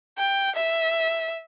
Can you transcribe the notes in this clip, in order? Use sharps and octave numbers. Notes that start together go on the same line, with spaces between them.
G5
E5